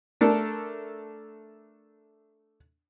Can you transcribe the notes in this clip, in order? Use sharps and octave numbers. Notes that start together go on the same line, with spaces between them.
A3 D4 A4 A#4